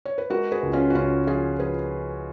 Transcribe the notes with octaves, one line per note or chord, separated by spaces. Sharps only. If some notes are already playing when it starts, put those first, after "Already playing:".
C#5
B4
G#3 F#4 A#4
G#4 B4
C#2
C#4 F4
F#4
C#2 C#4 F4
F3 F4 G#4
F3 G#4 B4